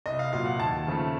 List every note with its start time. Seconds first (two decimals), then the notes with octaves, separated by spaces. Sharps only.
0.06 C2 D#5
0.19 F5
0.33 A#2 F#3 F5
0.46 F#5
0.59 D#2 A5
0.87 C#3 F3 A3